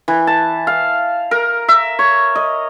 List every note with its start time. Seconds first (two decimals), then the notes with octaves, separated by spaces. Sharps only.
0.08 E3
0.27 A5
0.67 F5
1.31 A#4
1.69 E5
1.99 C#5
2.35 D#5